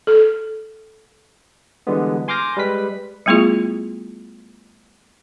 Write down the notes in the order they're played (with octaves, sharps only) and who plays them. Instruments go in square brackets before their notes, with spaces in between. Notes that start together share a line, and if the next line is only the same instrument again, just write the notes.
[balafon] A4
[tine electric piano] D3 E3 G3 G#3 B3
G#5 C6 D6 F6 G6 A#6
G3 G#3 B4 B6
[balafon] G3 A3 B3 E4 F4 G#4